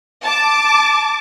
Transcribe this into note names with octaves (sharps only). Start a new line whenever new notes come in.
A5 D6